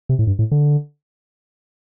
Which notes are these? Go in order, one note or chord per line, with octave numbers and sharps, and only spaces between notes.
C3
A2
G2
A2
D3